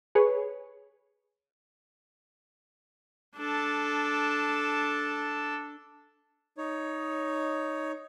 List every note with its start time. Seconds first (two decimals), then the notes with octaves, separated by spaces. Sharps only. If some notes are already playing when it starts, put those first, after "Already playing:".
0.15 G#4 B4 C#5
3.37 D4 A4
6.58 D#4 C#5